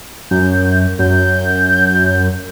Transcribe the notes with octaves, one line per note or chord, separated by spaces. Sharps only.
F#2 G6
F#2 G6